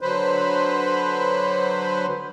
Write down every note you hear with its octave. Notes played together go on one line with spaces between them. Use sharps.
D3 F#3 B4 C5